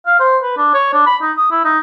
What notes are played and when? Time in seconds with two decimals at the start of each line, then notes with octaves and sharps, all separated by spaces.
0.06 F5
0.20 C5
0.43 B4
0.57 D4
0.74 C#5
0.93 D4
1.06 B5
1.22 D#4
1.37 D#6
1.51 E4
1.64 D#4